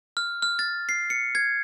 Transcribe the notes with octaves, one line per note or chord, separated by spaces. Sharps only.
F6
F6
A6
C7
C#7
G#6